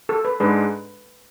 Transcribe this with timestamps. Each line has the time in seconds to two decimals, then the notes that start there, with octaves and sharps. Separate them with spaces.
0.09 A4
0.25 B4
0.40 G#2 G#3 D4 B4